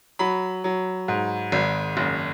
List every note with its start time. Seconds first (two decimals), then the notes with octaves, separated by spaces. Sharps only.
0.19 F#3 B5
0.64 F#3
1.08 G#2
1.52 G#1
1.97 F#1